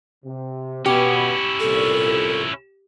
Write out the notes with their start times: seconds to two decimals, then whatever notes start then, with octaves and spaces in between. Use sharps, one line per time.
0.25 C3
0.86 B2 B3 C#4 E4 G4
1.60 C2 A#2 A4